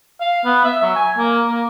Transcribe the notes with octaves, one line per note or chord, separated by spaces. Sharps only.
F5
B3
E5
F#3
G#5
A#3
A#3